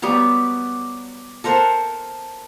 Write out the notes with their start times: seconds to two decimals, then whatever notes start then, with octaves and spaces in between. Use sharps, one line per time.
0.02 F#3 G3 B3 G4
1.44 A4 A#4 C5 F#5